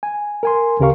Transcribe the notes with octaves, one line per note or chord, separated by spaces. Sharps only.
G#5
A#4 G#5 C6
D2 C#3 G4 A#4 F5 C#6